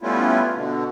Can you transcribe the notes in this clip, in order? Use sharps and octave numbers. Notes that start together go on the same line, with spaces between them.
G3 A3 B3 C#4 E4 F4
B2 D3